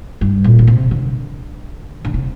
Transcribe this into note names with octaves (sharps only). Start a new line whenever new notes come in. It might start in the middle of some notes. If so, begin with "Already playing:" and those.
G2
A#2
D3
C3
D3
D3
C3